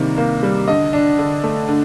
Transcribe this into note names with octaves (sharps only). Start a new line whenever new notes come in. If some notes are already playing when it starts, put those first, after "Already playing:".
Already playing: C3 D#3 G3 A#3
A#3
G3
D3 D#5
D4
D3
A3
D3